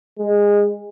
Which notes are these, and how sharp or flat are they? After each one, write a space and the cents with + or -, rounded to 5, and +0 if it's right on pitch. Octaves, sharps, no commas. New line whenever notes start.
G#3 -20